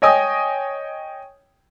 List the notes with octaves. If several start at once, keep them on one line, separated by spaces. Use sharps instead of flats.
C#5 D#5 G5 G#5 D#6